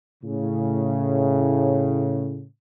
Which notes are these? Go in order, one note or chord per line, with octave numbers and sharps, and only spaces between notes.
A2 C#3